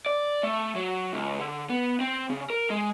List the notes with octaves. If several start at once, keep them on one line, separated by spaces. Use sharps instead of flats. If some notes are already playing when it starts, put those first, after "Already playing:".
D5
A3
F#3
C#2
D3
B3
C4
C#3
A#4
G#3